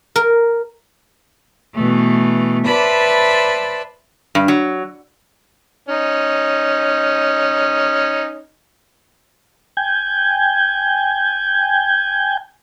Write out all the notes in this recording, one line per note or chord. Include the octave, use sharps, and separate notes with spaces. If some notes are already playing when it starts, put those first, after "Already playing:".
A#4
B2 E3 A3
B4 C5 D5 E5 A5 B5
G2
F#3
C#4 D#4
G5 G#5 G6 G#6